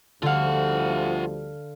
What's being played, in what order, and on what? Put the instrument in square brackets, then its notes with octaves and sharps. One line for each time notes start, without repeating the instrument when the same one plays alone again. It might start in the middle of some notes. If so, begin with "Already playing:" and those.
[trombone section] D2 F3 G3 [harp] D3 F5 [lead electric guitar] F4 F#5